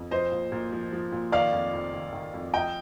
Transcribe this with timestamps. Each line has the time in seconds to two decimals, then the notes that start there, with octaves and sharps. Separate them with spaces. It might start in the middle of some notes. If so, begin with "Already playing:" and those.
Already playing: F2
0.11 F3 C5 D#5
0.32 A#2
0.52 A#2
0.72 F3
0.92 F3
1.12 A#2
1.32 D#3 D5 F5
1.52 F2
1.73 F2
1.93 D#3
2.13 D#3
2.34 F2
2.54 F3 D#5 G5